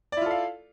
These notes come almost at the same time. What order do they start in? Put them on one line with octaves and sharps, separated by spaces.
D5 E4 F4 A4 F5